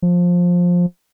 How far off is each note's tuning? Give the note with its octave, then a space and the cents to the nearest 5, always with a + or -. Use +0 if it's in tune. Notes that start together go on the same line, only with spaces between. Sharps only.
F3 +15